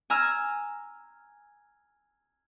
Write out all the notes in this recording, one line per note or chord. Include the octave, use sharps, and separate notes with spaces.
G#5 A#5 E6 F6